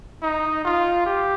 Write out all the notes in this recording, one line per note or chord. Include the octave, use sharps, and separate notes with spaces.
D#4
F4
G4